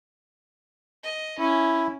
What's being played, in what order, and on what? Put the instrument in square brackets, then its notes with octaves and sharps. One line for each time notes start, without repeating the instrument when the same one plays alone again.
[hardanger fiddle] D#5
[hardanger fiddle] C#4 [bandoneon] E4